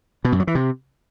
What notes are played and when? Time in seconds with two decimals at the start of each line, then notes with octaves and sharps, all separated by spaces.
0.25 B2
0.32 F#2
0.40 F#3
0.47 E3
0.55 C3